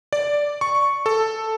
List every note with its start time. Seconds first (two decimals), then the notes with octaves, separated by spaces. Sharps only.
0.13 D5
0.61 C#6
1.06 A4